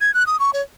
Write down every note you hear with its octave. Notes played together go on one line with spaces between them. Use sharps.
G#6
F#6
D#6
C#6
C#5